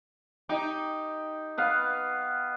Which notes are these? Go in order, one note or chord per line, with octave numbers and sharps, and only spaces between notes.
D#4 G4
B3 B4 F5